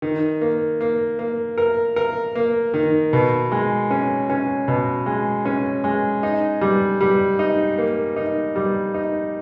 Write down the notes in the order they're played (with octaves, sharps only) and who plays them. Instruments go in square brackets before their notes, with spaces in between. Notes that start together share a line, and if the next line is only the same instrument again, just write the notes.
[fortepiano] D#3
A#3
A#3
A#3
A#4
A#4
A#3
D#3
B2
G#3
C#4
C#4
B2
G#3
C#4
G#3
D#4
G3
G3
D#4
A#3
D#4
G3
D#4